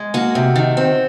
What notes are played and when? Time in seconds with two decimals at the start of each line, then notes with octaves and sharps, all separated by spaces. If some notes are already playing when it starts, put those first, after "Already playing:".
Already playing: G#3
0.14 A#3 F#4
0.35 C3
0.56 D#3
0.77 C4